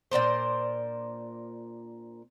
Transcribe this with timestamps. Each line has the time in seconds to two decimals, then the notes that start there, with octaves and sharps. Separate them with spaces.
0.11 A#2 D4 A#4 C5